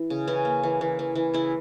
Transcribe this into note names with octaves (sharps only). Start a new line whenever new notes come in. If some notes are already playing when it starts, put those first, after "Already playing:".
Already playing: E3 E4
C#3
E3 C#4
A#3
E3
E3
E3
E3
C#3 E4